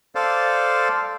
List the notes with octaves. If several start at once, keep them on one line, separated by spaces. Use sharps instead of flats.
A4 C5 D5 F5